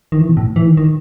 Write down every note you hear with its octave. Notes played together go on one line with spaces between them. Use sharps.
D#3
E3
B2
A2
E3
D#3
D#3